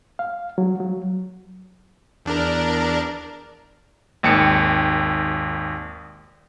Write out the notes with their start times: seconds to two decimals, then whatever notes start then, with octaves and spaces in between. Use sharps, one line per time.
0.19 F5
0.58 F#3
0.80 F#3
2.26 E2 D4 A#4
4.23 G#1 D#2 G5 C#7